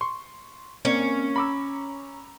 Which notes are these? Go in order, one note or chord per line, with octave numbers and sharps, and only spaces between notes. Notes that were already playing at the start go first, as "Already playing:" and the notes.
C6 C#6
A#3 C4 C#4 C#5
A#5 B5 D6 E6